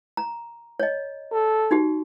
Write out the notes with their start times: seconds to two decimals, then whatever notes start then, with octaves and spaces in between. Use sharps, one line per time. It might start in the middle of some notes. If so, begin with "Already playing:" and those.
0.17 A#5
0.80 C#5 D#5
1.32 A4
1.71 D#4 F#4 G4